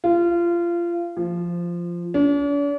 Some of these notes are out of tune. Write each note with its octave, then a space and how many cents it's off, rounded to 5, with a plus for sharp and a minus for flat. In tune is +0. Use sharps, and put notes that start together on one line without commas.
F4 -25
F3 -10
D4 -45